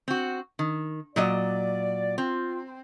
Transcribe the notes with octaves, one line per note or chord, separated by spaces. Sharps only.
C4 F#4
D#3
A#2 F#3 D5 D#5
C4 F4